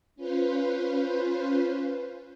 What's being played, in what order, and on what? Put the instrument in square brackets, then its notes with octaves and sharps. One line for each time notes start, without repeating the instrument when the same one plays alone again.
[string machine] C#4 F4 B4 C5